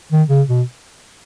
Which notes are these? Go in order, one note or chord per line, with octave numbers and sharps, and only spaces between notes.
D#3
C#3
B2